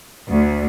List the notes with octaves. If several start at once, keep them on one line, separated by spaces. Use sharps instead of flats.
D2